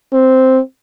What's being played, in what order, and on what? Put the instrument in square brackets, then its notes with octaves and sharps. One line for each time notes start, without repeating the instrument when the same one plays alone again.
[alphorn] C4